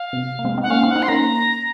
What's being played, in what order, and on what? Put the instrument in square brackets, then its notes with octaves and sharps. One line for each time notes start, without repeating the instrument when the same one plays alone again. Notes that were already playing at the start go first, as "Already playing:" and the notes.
Already playing: [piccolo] F5
[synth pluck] C3
A#3
G#3 C4
C4 D#4
[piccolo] F#5
[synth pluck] A#3 C#4 [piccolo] F5
[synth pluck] C4 D#4
[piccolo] F#5
[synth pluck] C4 D#4
[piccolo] C6
[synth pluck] A#3 C#4 [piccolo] A#5